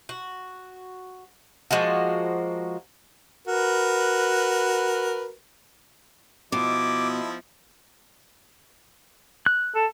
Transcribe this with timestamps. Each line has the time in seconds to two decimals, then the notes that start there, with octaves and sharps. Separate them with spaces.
0.09 F#4
1.71 F3 G#3 A#3 F#4
3.48 F#4 A#4 B4
6.52 B2 F3 E4 D#5 D6
9.46 F#6
9.75 A4